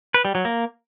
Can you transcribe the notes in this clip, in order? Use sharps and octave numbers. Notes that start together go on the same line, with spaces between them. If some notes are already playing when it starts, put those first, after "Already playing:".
B4
G3
F#3
A#3